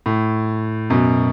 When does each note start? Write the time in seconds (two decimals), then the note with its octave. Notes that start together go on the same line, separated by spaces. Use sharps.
0.06 A2
0.90 F#2 B2